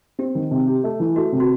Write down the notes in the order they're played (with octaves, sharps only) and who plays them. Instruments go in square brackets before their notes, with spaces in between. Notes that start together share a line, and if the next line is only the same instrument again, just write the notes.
[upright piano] C4 [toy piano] G4
[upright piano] D#3
C3
G4
A3
E3
[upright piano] A3 [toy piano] F#4
[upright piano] C3
[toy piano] F#4